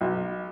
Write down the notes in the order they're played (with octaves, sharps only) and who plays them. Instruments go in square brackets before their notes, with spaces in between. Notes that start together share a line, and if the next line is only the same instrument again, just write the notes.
[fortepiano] B1